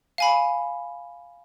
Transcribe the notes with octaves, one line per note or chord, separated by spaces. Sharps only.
F5 G#5 B5